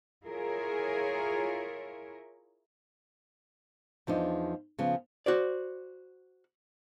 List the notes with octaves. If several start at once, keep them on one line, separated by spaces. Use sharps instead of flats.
E4 F4 G#4 A#4 C#5
E2 F3 D4 D#4
C#3 F3 B3 C#4
F#4 C5 D5